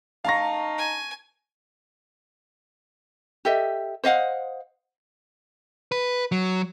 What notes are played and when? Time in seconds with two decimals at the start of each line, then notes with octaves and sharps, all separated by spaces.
0.25 D#4 F5 A5 A#5 C#6 A#6
0.78 G#5
3.45 G4 A4 D#5 E5
4.04 C5 D#5 F5 F#5
5.92 B4
6.32 F#3